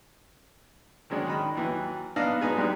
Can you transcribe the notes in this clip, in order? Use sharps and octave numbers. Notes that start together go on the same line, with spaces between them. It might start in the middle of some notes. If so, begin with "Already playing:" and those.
D#3 F#3 G#3 C#4 D4
D#3 D#5 B5
D#2 E3 F#3
B3 D4 D#4 D#5 F5 A5
F#3 G#3 B3 D#4 G#4
F#2 G3 G#3 D4 D#4